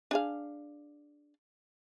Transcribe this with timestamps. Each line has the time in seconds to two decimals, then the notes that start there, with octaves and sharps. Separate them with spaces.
0.11 D4 G#4 F5